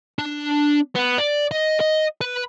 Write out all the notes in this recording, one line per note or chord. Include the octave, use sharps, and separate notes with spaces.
D4
B3
D5
D#5
D#5
B4